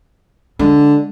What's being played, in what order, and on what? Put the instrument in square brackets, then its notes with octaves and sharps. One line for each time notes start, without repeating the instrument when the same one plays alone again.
[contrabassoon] D3 [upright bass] G#3